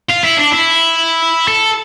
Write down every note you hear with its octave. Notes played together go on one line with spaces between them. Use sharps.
F4
E4
D4
E4
A4